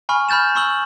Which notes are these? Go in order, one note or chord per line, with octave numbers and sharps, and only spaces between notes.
G#5 B5 C#6 F6
B5 F6 G6 A6 E7
B5 C#6 E6 F#7